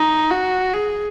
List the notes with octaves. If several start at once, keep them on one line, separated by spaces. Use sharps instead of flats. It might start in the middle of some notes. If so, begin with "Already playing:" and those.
Already playing: D#4
F#4
G#4